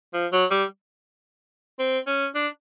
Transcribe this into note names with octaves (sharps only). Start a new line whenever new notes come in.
F3
F#3
G3
C4
C#4
D4